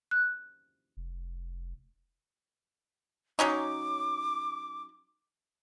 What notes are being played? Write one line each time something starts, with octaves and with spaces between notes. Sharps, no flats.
F#6
F1
F#3 C#4 D#4 D6